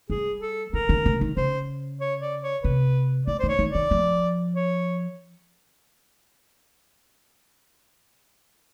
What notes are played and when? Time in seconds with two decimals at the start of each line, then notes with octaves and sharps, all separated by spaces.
0.10 G3 G#4
0.41 A4
0.73 D3 A#4
0.89 D3
1.06 D3
1.21 D#3
1.37 C#3 C5
2.00 C#5
2.21 D5
2.43 C#5
2.63 C3 B4
3.27 D3 D5
3.39 C5
3.43 D#3
3.49 C#5
3.59 D#3
3.70 D#3 D5
3.91 F3
4.55 C#5